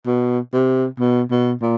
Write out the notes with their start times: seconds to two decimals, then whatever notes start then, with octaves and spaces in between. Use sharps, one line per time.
0.06 B2
0.53 C3
1.00 B2
1.31 B2
1.62 A#2